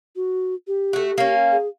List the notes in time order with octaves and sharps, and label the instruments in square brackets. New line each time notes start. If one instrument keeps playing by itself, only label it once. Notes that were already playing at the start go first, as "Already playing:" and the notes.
[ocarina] F#4
G4
[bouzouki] A3 F#4
A#3 C#4
[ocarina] G#4